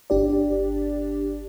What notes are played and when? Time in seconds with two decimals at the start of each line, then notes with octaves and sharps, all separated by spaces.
0.10 G1 D4 G4 D5